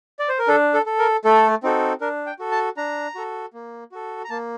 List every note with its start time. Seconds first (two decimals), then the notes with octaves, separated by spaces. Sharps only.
0.19 D5
0.29 C5
0.39 A#4
0.48 D4 A4
0.74 A4
0.86 A4
0.99 A#4
1.25 A3 A4
1.63 C4 D#4 F#4 A4
2.01 D4 A#4
2.26 G5
2.39 F#4 A4
2.52 A5
2.77 D4 A#5
3.15 F#4 A4
3.53 A#3
3.92 F#4 A4
4.24 A#5
4.30 A#3 A5